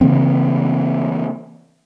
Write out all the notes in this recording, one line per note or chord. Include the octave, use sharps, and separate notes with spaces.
C#3 E3 A#3 C4